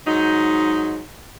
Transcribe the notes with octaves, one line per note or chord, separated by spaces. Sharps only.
G#2 F#3 D#4